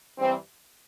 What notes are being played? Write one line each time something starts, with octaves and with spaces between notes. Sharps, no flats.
G2 E3 G3 C4